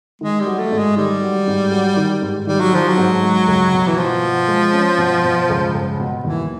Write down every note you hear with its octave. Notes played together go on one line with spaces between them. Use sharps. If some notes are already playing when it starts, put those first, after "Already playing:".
D#3 G#3
G3
F#3
A3
G#2
G#3
D#3 G3
F#3
G#2
F#3
D#3
G#2
D#3 G3
F#3
D#3 F3
F#3
G#2
G#3
C#2
B2
E3
B2 F3
B2
G#3
C#4
B2
B2
C#2
C#2
B2
D#2 E3